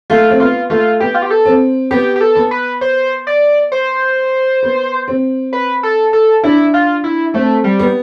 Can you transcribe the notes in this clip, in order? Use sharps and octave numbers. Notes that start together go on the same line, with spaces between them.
A3 F4
C4
B3 F4
A3 F4
B3 G4
F4
G4
A4
C4
B3 G4
G4
A4
B3
B4
C5
D5
C5
B3
C4
B4
A4
A4
D4 E4
F4
E4
A3 C4
G3
B3